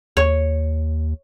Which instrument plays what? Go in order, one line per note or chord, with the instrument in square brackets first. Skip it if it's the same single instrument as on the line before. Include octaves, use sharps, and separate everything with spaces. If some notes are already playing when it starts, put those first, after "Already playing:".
[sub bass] D#2 [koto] C#5